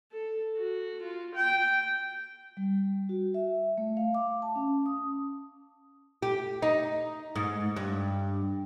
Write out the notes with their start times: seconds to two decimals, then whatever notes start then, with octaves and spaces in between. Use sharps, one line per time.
0.12 A4
0.57 F#4
1.02 F4
1.35 G5
2.57 G3
3.09 F#4
3.34 E5
3.78 A3
3.97 F5
4.15 D6
4.42 A5
4.56 C#4
4.86 D#6
6.23 G4
6.62 D#4
7.36 G#2
7.76 G2